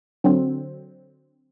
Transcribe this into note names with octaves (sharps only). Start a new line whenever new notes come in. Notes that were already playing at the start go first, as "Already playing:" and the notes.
D3 F#3 C4